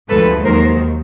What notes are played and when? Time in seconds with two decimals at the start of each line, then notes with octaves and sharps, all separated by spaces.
0.09 D2 D3 F3 G#3 A4 B4
0.43 D#2 D#3 F#3 A#4 C5